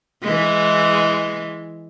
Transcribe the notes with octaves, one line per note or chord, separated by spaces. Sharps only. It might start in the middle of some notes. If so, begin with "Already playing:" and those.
E3 G#3